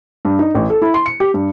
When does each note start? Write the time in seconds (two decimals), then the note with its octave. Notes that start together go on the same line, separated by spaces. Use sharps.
0.25 G2
0.39 D#4
0.55 A1
0.70 A4
0.82 E4
0.94 C6
1.06 C#7
1.20 G4
1.34 G2